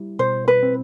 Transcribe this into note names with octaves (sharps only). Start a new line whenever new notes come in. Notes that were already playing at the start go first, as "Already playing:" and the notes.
Already playing: G3 E4
B2 C5
B4
C4